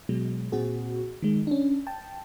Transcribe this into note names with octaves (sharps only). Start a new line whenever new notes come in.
B2 F#3 G#3
A#2 C4 F#4 G#4
D#3 G#3
C#4 D4
G5 A5